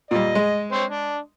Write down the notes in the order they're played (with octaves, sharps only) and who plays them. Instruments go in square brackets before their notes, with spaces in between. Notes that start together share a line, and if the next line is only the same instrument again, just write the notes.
[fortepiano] A#2 G3 [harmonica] D#5
[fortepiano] G#3
[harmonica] C4 C5 C#5
D4